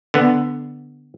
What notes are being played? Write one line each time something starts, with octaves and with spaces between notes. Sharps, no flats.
D3 B3